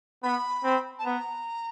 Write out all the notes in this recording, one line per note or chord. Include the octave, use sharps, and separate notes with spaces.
B3 B5
C4
A5
B3 A#5